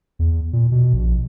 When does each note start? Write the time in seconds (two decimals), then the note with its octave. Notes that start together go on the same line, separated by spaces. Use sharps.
0.19 E2
0.53 A#2
0.72 B2
0.93 A#1